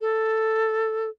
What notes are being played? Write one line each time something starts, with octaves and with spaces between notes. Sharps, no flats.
A4